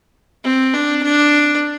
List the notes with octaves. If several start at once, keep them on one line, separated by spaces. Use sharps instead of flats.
C4
D4
D4